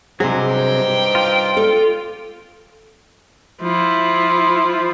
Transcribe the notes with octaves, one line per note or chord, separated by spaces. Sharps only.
G2 C3 F#3 D#4 G#4 C5
G5
F4
A4 D5
F3 E4